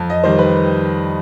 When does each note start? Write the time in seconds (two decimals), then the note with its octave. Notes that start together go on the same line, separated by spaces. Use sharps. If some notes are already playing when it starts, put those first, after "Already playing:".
Already playing: F2
0.10 D#5
0.24 D#3 G3 C5
0.39 B4